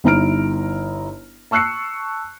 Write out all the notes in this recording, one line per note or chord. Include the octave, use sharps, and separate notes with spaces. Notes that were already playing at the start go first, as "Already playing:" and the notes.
G1 D#4 E4 A#5 F6 D7
A5 C#6 E6 F#6 C7 C#7